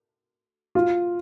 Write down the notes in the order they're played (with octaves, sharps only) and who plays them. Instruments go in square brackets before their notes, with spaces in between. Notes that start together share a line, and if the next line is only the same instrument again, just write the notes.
[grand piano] F4